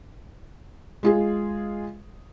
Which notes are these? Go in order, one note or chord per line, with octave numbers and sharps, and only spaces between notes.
G#3 F4 G#4